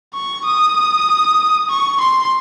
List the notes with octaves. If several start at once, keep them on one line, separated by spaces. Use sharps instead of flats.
C#6
D#6
C#6
C6